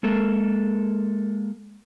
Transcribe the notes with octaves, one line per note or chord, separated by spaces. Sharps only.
G#3 A#3 A4 A#4